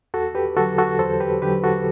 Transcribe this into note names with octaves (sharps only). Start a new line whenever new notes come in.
E2 F#4 A4
G4 B4
D3 F#3 F#4 A4
F#4 A4
E2 A4 C5
G4 B4
D3 F#3 G4 B4
F#4 A4